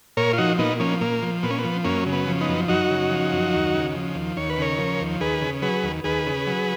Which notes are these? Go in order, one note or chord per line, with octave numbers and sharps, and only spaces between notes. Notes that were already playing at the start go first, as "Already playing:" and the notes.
A#2 A#4 C#5
F4
F3 D#4 F#4
A#2 B3 D#4
F3 A#3 C#4
A#2 A#3
F3
A#2 B3
C#4
B3
F3
F#2 A#3 C#4
C#3
B3
F3
B3 D#4
F#2
F#2 D#4 F#4
C#3
F3
F#2
D#2
C#3
F3
D#2
D#2 C#5
B4
C#3 A#4 C#5
F3
D#2
D#2 G#4 B4
C#3
F#3 G#4 B4
D#2
D#2 G#4 B4
C#3
F#3